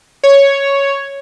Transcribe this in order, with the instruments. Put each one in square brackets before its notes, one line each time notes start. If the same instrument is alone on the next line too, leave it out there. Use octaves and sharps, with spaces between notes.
[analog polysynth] C#5